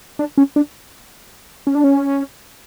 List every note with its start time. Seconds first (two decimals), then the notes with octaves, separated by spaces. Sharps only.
0.19 D4
0.38 C#4
0.56 D4
1.67 C#4
1.75 D4
1.84 C#4